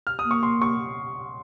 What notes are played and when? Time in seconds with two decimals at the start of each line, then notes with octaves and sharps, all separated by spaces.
0.07 F6
0.19 D#6
0.24 A#3
0.31 C#6
0.43 C6
0.62 C#6